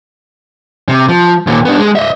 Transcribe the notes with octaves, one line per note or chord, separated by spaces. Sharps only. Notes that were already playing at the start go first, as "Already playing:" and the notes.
C3
F3
D#2 A#2
B3 D4
G#3
D#5 E5